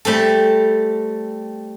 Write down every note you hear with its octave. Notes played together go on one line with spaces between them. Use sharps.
G3 A3 C4 A4